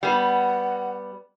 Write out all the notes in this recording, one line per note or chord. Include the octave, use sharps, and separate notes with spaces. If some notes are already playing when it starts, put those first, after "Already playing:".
G3 B3 F#5